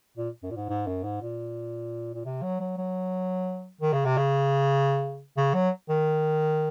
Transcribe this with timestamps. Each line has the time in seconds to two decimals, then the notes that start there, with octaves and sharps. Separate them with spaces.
0.17 A#2
0.43 F#2
0.51 A#2
0.56 G#2
0.69 G#2
0.87 F#2
1.04 G#2
1.22 A#2
2.14 A#2
2.25 C3
2.43 F#3
2.60 F#3
2.77 F#3
3.81 D#3
3.93 C#3
4.05 C3
4.17 C#3
5.37 C#3
5.54 F#3
5.89 D#3